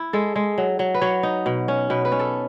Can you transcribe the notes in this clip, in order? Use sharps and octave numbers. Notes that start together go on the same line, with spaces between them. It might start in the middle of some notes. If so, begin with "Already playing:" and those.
Already playing: E4
G#3 A4
G#3
F#3
F#3
B4
F#3 C#5
D#4
B2
C#4
B2 B4
B4
C#4
A4